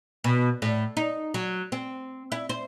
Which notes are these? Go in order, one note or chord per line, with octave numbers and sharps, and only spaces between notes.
B2
A2
D#4
F#3
C4
E4
C5